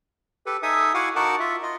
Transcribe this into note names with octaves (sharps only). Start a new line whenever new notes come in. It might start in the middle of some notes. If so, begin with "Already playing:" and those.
G4 A4 B4
D#4 A4 E5 G#5 D#6
E4 F#4 F5 F#5 G#5 D6
D#4 F#4 A#4 F#5 A5 D6
F4 E5
F4 D#5